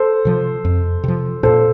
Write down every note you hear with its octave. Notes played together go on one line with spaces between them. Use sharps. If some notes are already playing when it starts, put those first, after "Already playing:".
Already playing: A4 C5
C3 F3
F2
C3 F3
A#2 A4 C5